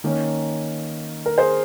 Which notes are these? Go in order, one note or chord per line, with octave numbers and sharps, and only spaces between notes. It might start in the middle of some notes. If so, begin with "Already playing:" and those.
D#3 A#3 C#4
A#4
G#4 C5